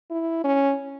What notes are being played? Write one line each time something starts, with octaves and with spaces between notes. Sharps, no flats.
E4
C#4